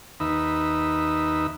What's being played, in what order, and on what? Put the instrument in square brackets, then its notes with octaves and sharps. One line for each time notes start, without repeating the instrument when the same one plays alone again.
[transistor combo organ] D#2 D#4 B4 E5